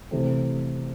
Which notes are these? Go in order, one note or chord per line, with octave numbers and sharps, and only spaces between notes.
C3 E3 A3 C4